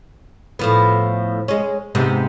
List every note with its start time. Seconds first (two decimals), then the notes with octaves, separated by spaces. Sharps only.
0.59 A2 F3 B3
1.48 G#3 C#4
1.95 G#2 C3 B3